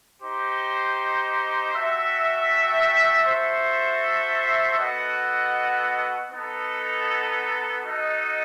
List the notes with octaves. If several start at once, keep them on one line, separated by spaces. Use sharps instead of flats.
D#4 G4 C5
F#4 A4 E5 G5
F#4 A4 C5 E5
B3 F#4 A4 D#5 F#5
B3 D#4 A4
D#4 F#4 A4 D#5